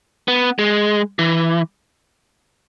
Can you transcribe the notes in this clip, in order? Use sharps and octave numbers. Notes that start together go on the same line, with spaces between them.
B3
G#3
E3